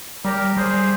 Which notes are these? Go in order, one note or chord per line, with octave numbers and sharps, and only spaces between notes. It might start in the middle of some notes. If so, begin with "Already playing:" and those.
G3 G4 A#4
A#4
G3 G#4 C5